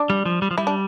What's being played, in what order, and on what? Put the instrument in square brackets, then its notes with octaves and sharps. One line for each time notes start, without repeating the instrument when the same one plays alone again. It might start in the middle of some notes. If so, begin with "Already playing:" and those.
Already playing: [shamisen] D4
[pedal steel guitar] G3
F3
G3
F3
[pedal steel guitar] G3 [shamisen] E4
[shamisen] D4